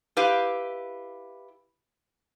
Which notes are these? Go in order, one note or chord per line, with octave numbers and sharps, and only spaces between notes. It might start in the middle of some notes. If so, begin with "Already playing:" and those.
E4 G4 B4 F5